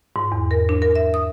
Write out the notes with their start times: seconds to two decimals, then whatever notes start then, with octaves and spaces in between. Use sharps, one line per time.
0.16 G#2
0.32 E2
0.51 A#4
0.69 D4
0.82 A#4
0.95 E5
1.14 D#6